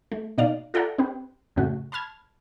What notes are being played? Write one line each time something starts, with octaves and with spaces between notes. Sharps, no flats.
A3
B2 D#4 D5 F5
F4 A4 D5 E5 F#5 A#5
C4 G4 B4
F#2 A2 C#3 A3 F#4
A5 B5 F6 G#6